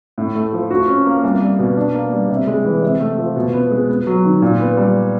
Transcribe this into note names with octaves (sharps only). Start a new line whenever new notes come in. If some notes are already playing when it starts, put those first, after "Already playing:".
A2
A3
F3
F#4
C#4
A#3
C2
G3
B2
D4
A#3
G3
C3
G#3
E3
C3
A3
F3
B2
B3
G#3
B3
F#3
D#3
A#2
B3
G3